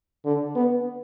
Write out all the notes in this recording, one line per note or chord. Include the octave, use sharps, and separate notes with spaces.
D3
B3